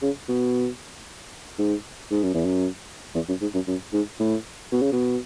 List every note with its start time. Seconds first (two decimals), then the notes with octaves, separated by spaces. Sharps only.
0.02 C#3
0.29 B2
1.59 G#2
2.11 G#2
2.23 F#2
2.35 E2
2.46 F#2
3.15 E2
3.29 F#2
3.42 G#2
3.54 F#2
3.67 F#2
3.93 G#2
4.20 A2
4.72 B2
4.82 C#3
4.92 B2